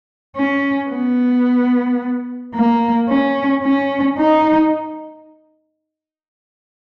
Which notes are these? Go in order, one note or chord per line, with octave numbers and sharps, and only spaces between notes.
C#4
B3
A#3
C#4
C#4
D#4